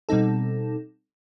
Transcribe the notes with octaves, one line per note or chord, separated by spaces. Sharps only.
B2 G3 C4 D#4 A4